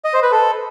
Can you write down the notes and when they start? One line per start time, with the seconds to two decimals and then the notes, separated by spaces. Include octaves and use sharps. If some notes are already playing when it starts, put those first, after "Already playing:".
0.05 D#5
0.14 C5
0.23 B4
0.32 A4